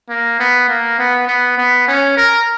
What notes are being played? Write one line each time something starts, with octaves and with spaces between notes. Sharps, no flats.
A#3
B3
A#3
B3
B3
B3
C#4
A#4